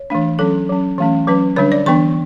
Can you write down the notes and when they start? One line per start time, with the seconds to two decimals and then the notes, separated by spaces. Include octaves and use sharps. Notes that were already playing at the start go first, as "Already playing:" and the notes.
Already playing: C#5
0.10 E3 A3 D4
0.39 F#3 C#4 A4
0.69 F#3 C#4
0.98 E3 A3 C#4
1.27 F#3 C#4 B4
1.56 D3 G3 D4 C#5
1.72 D5
1.86 E3 B3 D4 C#6